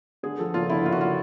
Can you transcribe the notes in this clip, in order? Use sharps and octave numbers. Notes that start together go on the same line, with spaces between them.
D3 G#4
F3 A4
F#1 F4
D3 E4
F#1 F4
F#4
F4